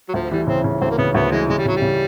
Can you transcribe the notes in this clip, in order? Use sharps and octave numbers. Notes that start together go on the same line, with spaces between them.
F#3
D2 F3
E3 G3
C#3 C4
C#3
D2 C4
A#3
C#3 B3
D2 B3
E3 G#3
C#3 G#3
G3
C#3 F#3
G3
C#3